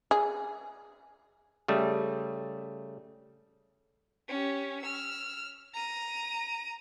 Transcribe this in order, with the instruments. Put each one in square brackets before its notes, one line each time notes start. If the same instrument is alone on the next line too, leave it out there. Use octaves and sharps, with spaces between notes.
[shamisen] G#4
[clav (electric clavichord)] C#3 G3 A3
[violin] C#4 G4
E6 F6
A#5 D#7